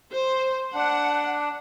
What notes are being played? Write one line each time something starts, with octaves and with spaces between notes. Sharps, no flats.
C5
D4 F#5